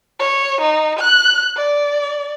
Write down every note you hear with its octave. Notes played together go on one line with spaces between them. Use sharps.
C#5
D#4
F#6
D5